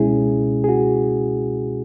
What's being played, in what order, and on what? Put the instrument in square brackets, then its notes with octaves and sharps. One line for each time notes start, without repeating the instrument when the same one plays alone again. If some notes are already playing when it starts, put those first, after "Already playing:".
Already playing: [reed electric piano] C#2 B2 G#3 C#4 E4 G#4
G#4
F#4